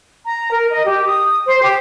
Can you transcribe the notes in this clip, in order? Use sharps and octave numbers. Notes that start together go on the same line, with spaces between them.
A#5
A#4
D#5
G4
D#6
C5
G4